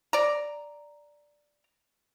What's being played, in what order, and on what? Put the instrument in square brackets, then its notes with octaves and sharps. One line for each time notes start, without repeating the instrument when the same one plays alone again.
[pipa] D5 A#5